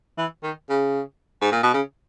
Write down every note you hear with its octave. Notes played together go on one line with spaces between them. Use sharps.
E3
D#3
C#3
G#2
A#2
B2
C#3